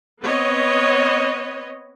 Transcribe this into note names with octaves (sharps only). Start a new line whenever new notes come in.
B3 C4 B4 C#5 D#5